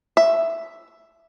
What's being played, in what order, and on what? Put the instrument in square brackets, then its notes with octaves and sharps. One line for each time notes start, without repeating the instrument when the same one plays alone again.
[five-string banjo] E5